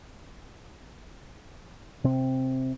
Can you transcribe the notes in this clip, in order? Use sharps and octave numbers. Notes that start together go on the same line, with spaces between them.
C3 C4